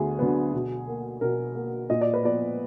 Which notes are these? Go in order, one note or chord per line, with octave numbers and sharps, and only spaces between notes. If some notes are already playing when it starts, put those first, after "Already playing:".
Already playing: D2 D3 B3 G#4
D3 F#3 B3
B2
A#3
B2 A#4
A#3
A#2 D#5
D5
B4
F3 B3 D5